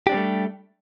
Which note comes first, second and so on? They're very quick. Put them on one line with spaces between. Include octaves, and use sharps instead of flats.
G4 D4 C4 G3 A3